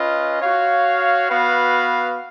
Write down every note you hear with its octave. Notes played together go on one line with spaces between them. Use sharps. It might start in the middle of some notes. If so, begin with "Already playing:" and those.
Already playing: C#4 F4 B4 D#5
F#4 C#5 F5
B3 F#4 B4 F5